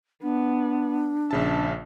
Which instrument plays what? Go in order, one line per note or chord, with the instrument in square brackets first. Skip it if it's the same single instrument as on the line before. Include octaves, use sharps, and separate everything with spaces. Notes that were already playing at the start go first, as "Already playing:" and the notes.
[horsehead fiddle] B3 [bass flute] D4
[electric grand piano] A#1 C#3 A5 [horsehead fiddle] E5